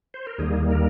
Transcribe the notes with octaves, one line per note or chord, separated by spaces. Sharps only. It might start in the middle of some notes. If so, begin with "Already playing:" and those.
C5
A#4
D#2 D#3 G3 A#3 G#4
A#4